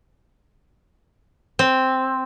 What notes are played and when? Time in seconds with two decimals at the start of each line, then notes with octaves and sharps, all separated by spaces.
1.59 C4